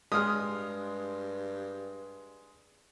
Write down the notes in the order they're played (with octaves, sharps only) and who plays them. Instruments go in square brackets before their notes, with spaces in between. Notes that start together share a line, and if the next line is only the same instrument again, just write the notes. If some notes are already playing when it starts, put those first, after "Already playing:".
[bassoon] G2 [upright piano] G#3 [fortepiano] D#6 F6